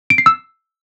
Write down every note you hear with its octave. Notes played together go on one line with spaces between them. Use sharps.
D7
C7
E6